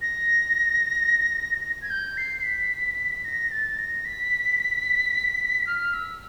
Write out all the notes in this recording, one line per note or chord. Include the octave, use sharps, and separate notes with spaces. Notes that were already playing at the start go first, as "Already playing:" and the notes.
A#6
G#6
G6
C7
B6
A#6
A6
A#6
B6
F6
E6